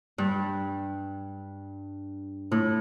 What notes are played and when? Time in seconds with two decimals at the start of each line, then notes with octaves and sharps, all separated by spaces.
0.18 G2
2.52 A2